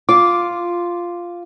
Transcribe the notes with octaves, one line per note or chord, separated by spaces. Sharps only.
F4 D6